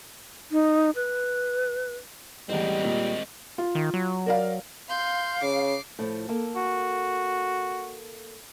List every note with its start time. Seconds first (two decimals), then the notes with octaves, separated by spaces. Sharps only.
0.52 D#4
0.96 B4
2.49 E2 A2 G3 G#3 C4 D#5
2.81 A#2 A#3
3.58 F4
3.75 D#3
3.94 F#3
4.26 A#4 D5 F5
4.88 F5 C6 G6
5.42 C#3 D6 C7
5.99 A2 F3
6.28 A#3 A4
6.56 F#4